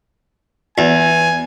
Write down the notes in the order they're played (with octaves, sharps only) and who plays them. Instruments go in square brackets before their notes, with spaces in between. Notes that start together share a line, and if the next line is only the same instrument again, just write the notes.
[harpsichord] E2 [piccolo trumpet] G#5